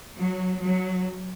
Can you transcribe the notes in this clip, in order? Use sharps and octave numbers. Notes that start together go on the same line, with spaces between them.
F#3
F#3